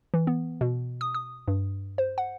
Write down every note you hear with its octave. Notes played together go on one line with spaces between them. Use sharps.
E3
B3
B2
D#6
D#6
G2
C5
F#5